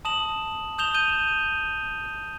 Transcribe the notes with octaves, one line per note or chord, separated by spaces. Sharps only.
A5 D#6 E7 F#7
D#6 G6 E7 F7 G7
G6 D#7 E7 G7